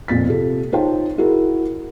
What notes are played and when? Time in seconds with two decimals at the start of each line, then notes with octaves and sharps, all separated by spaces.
0.08 F2 A#2 A6 B6
0.26 C3 F4 G4 A4
0.72 D#4 F4 C5 C#5 G5 A5
1.18 E4 F#4 G#4 A#4